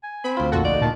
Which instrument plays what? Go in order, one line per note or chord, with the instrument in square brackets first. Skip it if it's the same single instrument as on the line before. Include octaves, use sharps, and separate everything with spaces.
[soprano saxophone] G#5
[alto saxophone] C4 [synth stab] B5
[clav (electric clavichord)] D2 F4 [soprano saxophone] C5
[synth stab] A#1 F2 F#4 [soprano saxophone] A4
[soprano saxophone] D#4 [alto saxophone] D5
[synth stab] A#2 D#3 [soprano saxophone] A5